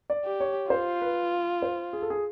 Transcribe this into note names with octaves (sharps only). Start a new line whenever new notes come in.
D5
G4
C#5
F4 C5
B4
C5
G#4
A4
G#4